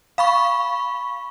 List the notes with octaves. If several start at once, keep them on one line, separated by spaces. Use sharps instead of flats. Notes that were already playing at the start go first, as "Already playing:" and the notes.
F5 B5 C#6